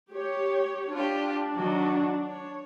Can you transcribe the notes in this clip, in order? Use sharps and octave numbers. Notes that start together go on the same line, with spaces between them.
G4 C#5
D4 F4 G4
D#3 F#3 F#4
C#5